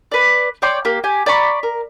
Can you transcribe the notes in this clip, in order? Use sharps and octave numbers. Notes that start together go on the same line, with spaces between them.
B4 D5
C#5 D5 G5 C6
A#3 G4
G4 G#5
D5 A#5 B5 C#6
A#4